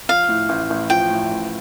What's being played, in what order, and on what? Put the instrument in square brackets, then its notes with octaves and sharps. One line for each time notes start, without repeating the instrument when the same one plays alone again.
[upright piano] F3 [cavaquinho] F5
[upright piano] A2
A1
A1
[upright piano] F3 [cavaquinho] G5
[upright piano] A2
A1